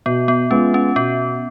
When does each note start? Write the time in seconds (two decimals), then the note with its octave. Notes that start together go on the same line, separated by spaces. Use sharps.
0.06 B2 B3
0.28 B3
0.51 G#3 B3 C#4 F4
0.74 C#4
0.96 B2 B3